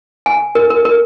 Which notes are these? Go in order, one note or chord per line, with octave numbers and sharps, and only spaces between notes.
G#5
A#4
A#4
A#4